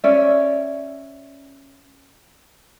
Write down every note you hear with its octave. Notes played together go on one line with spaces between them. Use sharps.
C#4 D5 E5